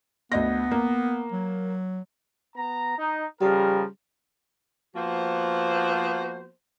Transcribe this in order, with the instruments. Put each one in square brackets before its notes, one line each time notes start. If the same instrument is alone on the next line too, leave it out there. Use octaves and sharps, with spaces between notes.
[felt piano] D2 D#5 A#6 [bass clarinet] B3
[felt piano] A#3
[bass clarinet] F#3
[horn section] B3 A#5
D#4
[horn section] C#3 F3 A#4 [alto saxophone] G3
[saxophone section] F3 A#3 B3 F#4 C5